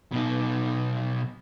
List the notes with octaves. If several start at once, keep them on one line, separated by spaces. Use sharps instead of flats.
B2 D#4